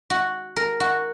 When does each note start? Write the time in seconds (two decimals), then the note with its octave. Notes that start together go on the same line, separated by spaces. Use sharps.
0.10 F#4
0.56 A#4
0.80 F#4